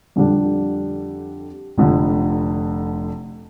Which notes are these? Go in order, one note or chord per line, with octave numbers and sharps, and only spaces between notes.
F2 D3 G3 D4 G4
F1 F2 D3